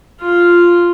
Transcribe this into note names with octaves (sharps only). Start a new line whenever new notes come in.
F4